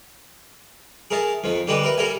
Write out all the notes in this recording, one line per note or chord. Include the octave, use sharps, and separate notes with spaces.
G#4 A#4 C#5 E5 A5
F2 D#3 F3
D3 E3 G3 D#4 G4 B4
A#4 B4 E5
G3 A4 A#4 C#5 E5 G#5